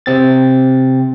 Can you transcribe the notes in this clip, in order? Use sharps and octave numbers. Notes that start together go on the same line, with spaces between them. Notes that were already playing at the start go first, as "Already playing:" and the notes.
C3 C4 A6